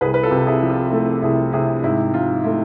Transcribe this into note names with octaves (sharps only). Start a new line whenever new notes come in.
C2 G#4 B4
B4
F4 A4
C3
E4 G#4
F3
F4
A3
C2 E4 G#4
C3 E4 G#4
G#2 E4
F3 F4
A3 E4